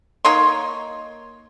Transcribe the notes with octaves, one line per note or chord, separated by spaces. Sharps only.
A#3 D#4 C#5 C6